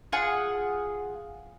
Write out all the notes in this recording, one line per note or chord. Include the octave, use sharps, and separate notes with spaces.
F4 G#4 F#5